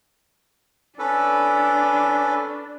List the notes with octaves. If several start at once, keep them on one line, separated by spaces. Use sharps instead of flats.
C#4 D4 A4 B4